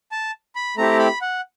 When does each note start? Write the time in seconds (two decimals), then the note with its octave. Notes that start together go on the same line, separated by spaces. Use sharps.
0.12 A5
0.55 B5
0.77 A3 C4 E4 G4 A#5
0.99 B5
1.21 F#5